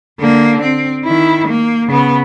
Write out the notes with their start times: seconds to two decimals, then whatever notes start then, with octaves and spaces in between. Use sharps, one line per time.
0.20 D3 A#3
0.62 C4
1.05 D#3 E4
1.48 A#3
1.87 C#3 B3